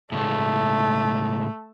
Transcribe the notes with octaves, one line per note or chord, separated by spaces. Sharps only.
A2 C#3 G#3 A3